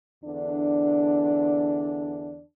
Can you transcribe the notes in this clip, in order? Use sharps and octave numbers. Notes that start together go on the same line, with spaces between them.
E2 D3 D4